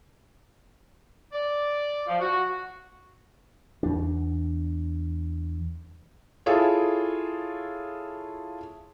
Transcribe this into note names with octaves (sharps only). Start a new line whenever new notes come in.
D5
F3
F#4
E2 D4
E4 F4 G#4 A4 C#5